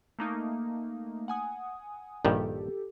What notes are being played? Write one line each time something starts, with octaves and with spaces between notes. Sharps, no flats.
A3 A#3 D#4
F#5 G#5 D#6
A#1 G2 D#3 G4 A4